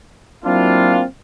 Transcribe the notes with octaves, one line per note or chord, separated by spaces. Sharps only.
F#3 A#3 C4 D4 E4 F4